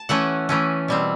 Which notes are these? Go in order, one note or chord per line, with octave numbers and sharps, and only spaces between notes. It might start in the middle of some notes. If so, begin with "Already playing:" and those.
Already playing: A5
E3 A3 C#4 F#5
E3 A3 C#4
B2 G3 C4